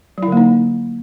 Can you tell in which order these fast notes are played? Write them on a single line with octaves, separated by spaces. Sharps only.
F#3 E4 D3 A#3 D#4